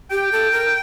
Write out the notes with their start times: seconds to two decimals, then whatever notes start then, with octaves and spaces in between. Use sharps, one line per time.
0.11 G4 G5
0.32 A4
0.52 A#4